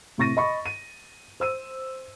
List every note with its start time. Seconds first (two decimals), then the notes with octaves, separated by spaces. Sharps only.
0.18 A2 C3 C#6 A6 A#6 D#7
0.37 D#5 B5 C#6
0.66 D#7
1.40 C5 E6 D#7